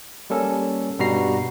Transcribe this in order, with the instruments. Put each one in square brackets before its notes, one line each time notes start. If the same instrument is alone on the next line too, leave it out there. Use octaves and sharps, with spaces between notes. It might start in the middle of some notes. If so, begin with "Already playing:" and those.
[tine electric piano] G3 A#3 C#4 A4
G2 B2 G3 F#4 A#5 C7